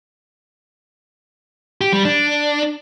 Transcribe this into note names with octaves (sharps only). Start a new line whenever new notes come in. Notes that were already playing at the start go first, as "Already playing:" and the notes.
G4
G3
D4